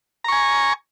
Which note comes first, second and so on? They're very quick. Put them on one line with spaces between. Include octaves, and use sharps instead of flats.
A#5 C#6 G#5